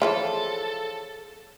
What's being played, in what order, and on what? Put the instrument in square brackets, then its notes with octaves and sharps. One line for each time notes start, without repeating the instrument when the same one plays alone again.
[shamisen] E3 F3 F4 [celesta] G#4 C#5 [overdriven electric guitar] A4